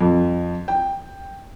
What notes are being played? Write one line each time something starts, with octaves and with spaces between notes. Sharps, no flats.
F2
G5